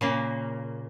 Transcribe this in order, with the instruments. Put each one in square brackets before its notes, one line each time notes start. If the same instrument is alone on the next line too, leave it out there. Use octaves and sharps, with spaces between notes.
[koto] A#2 C#3 A#3